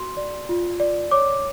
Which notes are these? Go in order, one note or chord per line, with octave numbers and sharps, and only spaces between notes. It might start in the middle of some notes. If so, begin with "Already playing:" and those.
Already playing: F#4 C6
D5
F4
D5
C#5 D6